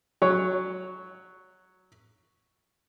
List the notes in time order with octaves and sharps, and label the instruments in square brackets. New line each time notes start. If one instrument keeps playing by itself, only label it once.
[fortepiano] F#3 C#5